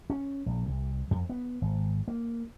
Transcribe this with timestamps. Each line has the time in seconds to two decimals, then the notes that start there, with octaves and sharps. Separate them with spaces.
0.10 C#4
0.46 A#1
0.68 C2
1.11 F2
1.30 B3
1.62 G#1
2.08 A#3